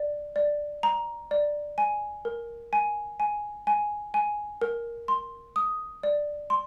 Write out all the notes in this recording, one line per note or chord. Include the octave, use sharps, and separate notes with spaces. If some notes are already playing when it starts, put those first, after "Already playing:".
Already playing: D5
D5
A#5
D5
G#5
A#4
G#5
G#5
G#5
G#5
A#4
C6
D#6
D5
C6